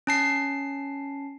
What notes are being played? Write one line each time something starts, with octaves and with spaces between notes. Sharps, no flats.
C#4 A5 C7